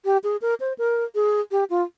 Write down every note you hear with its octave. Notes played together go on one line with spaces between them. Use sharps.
G4
G#4
A#4
C5
A#4
G#4
G4
F4